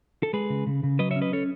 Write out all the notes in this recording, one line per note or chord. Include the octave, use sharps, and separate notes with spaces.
A4
G#3 G#4 B4
C#3
C#3
C#3
F#3 B4 D#5
C#5 E5
C#4
B4 D#5
C#4 A4 C#5